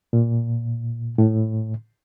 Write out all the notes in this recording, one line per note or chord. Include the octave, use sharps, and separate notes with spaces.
A#2
A2